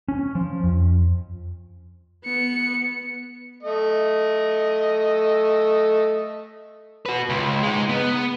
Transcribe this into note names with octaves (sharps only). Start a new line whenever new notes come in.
C#4
F3
F2
B3 C#7
A3 D#5
F#4 B4
C#2
G#3 D#4
B3